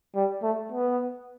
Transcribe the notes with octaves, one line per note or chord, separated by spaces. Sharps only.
G3
A3
B3